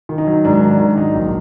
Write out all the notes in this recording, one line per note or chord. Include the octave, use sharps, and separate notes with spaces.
D#3
D#4
F#3
G#2 D4
D#3
D4
D#3
F#3 D#4
A#1